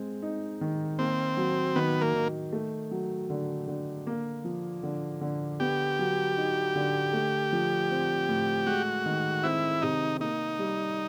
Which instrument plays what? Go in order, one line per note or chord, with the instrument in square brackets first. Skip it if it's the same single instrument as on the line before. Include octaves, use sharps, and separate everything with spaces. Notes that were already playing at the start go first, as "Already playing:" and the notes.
Already playing: [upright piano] G#3 C4
D#4
D#3
[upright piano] A#3 [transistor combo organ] C4
[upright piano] F#3
[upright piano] D#3 [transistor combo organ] B3
[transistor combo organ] A#3
[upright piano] D#3
A3
F#3
D3
D3
A#3
F3
D3
D3
[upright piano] B3 [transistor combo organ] G4
[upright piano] F#3
D#4
D3
A3
F3
C4
A2
[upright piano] G#3 [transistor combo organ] F#4
[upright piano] D#3
[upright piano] C4 [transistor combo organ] E4
[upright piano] C3 [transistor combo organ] D#4
[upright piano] A#3 [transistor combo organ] D#4
[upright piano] G3